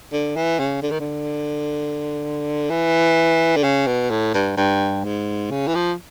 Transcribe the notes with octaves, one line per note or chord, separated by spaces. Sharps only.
D3
E3
C#3
D3
D#3
D3
E3
D3
C#3
B2
A2
G2
G2
G#2
C#3
E3
F3